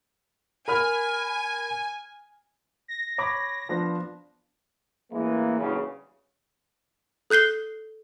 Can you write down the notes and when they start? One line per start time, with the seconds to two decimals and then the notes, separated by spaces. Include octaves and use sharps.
0.68 A#4 G#5 B5 F6
2.88 A#6
3.18 C#5 B5 D6
3.69 F3 B3 D4
5.11 A1 E3 G#3 A#3
5.58 F#1 E2 G2 C#3
7.30 A4 F#6 G6 C7 G7